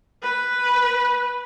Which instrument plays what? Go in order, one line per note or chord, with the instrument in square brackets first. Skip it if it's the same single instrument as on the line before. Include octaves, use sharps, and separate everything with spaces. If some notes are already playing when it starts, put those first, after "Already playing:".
[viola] B4